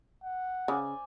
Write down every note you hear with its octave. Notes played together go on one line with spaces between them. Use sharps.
F#5
C#3 C5 D5 G#5